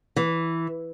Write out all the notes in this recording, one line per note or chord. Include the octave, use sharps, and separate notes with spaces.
E3